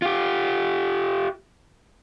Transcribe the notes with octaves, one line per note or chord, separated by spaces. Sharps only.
F4 G4